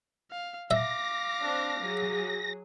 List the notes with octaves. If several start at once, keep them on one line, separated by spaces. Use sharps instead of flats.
F5
E5 F5 D6 A#6
C4 D4
F#3 G#4